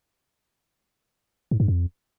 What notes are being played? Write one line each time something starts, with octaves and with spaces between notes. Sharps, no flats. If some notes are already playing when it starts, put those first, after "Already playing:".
G#2
G2
F2